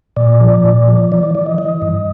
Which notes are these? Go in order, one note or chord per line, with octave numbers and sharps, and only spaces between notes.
A#2 D5
F3
A#2
F3
E3 D5
D5
E3 D5
D#5
E3 D#5
G2